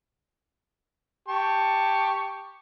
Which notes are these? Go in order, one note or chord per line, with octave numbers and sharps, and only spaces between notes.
G4 A5 C#6